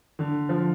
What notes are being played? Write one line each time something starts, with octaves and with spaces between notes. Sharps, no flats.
D3
F3